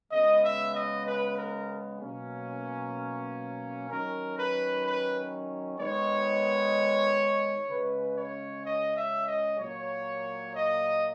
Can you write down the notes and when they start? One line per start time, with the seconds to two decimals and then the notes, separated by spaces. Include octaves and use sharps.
0.11 C#3 G#3 B3 D#5
0.43 E5
0.74 D#5
1.06 B4
1.37 A#4
2.01 B2 F#3 A#3 C#4
3.90 D#3 F#3 C#4 A#4
4.37 B4
4.84 B4
5.79 D#3 G#3 B3 C#5
7.69 C#3 G#3 C#4 B4
8.16 C#5
8.64 D#5
8.95 E5
9.27 D#5
9.58 A#2 F#3 A#3 C#5
10.54 D#5